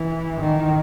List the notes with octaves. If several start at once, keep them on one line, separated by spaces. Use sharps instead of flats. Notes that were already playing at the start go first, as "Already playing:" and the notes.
Already playing: E3
D#3